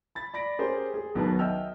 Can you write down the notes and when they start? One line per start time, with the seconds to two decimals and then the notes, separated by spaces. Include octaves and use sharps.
0.15 B5 A6
0.34 D5 B5 A#6 D7
0.59 C#4 G4 G#4 A#4 C5
0.94 G#4
1.15 B1 B2 D#3 F#3 B4 A5
1.39 D#5 E5 G5 E6 F6